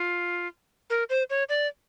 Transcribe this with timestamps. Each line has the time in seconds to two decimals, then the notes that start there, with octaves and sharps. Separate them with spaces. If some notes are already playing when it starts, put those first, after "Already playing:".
Already playing: F4
0.90 A#4
1.10 C5
1.30 C#5
1.49 D5